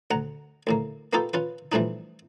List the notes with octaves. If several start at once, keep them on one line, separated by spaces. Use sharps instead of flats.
D2 F#5 A#5
D2 A2 A#3
A#3 B3 D#4 F4 G4 A4
C#4 F4 B4
E3 F3 G3 A3 D4 D#4